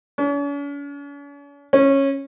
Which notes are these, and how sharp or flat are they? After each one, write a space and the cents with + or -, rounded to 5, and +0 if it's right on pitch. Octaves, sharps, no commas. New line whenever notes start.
C#4 +45
C#4 -15